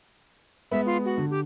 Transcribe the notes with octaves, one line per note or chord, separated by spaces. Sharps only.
G#3 B3 E5
F4
F#4
D3
G4